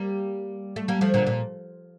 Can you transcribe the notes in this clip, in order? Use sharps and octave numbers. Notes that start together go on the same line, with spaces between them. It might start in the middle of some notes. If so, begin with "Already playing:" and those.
Already playing: G3 A#3
A3
G3 A#3
F3 A3
A#2 D3
A#2